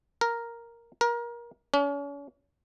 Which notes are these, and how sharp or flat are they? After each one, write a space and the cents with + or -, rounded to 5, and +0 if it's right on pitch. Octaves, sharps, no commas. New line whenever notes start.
A#4 +0
A#4 +25
C#4 +40